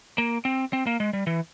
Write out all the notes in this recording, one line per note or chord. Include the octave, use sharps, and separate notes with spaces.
A#3
C4
C4
A#3
G#3
G3
E3